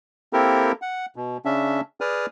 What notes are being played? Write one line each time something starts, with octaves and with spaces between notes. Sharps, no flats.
A#3 C4 E4 G4 A4 A#4
F#5
B2
C#3 C#4 D4 E5
G#4 B4 D5 D#6 F6